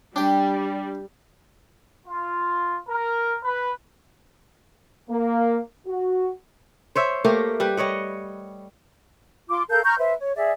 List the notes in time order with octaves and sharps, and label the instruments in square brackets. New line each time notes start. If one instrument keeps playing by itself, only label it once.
[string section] G3 [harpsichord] D4 G5 [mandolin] G4
[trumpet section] F4
A#4
B4
[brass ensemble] A#3
F#4
[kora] C5 C#5 E5
A3 A#3 G4 A#4
G3 G4 B4
G3 C#5 D#5 F#5
[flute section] F4 C6 D6
A4 A#4 F5 G6
A#5 C#6 F6 G6
B4 C5 E5
C#5
G#4 D5 E5